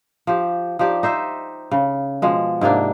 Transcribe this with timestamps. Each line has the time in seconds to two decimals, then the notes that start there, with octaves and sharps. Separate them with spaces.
0.27 F3 G4
0.79 F3 D#4 G4 D5
1.03 D#4 C5 E5
1.71 C#3
2.22 B2 F3 G#3
2.61 G#2 C3 A#3 D4